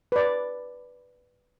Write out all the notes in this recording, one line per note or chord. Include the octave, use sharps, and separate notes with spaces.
B4 D5